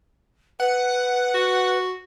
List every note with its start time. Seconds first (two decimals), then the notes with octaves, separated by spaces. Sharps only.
0.60 B4 F#5
1.34 F#4